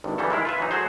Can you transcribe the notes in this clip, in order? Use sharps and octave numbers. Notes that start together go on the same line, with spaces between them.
G#1 G2
C#3 E3 F#3 G3 A4
D#3 G#3 E4 A#4
F4 B4 E5
E3 F#3 D#4
F#3 A3 F#4 G#4 C5